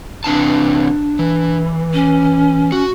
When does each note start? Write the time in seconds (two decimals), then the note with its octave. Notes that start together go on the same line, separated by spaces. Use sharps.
0.24 C3 E3 D4 A5
1.19 E3
1.93 C#4
2.72 F#4